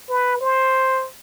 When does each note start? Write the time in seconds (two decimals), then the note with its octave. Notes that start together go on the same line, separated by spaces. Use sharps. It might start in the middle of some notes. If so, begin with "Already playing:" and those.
0.09 B4
0.41 C5